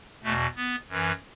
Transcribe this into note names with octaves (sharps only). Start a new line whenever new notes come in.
E2 B2 A3
B3
F#2 E3